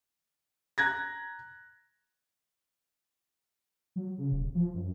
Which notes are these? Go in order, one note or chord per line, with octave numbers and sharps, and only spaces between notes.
A#5 F#6 G#6 A#6
F#3
C#3
D#1
F3
F#2